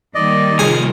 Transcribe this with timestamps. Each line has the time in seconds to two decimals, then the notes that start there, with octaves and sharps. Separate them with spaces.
0.15 D#3 G3 A#3 D5 D#5
0.59 C2 F3 G#4 C#5